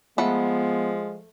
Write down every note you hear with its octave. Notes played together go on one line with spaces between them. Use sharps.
F3 G#3 A3 B3 F#5 B5